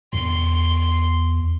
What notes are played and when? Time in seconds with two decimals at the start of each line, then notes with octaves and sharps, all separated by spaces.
0.13 E2 C6